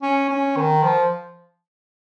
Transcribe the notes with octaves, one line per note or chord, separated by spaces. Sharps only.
C#4
C#4
D#3
F3